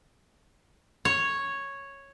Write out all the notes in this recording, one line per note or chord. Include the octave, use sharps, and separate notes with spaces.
C#5